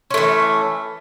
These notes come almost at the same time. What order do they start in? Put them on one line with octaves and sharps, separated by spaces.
C#4 A3 E3